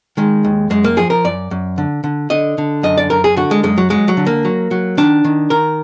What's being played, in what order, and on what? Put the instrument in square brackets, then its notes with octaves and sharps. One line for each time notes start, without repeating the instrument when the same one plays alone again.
[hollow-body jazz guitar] D#3 G#3
D#2
F#2 G#3
A#3
F3 G#4
A#4
F#2 D5
F#2
D3
D3
D3 D#5
D3
F#2 D#5
D5
F#2 A#4
G#4
D3 F#4
G#3
F#2 G#3
F#3
F#3 G#3
F#3
D3
A#3
F#3
F#3
D#3 D4
D#3
D#3 A#4